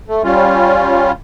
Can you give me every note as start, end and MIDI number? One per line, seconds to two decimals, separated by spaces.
0.08 0.22 57
0.24 1.12 55
0.24 1.12 61
0.24 1.12 65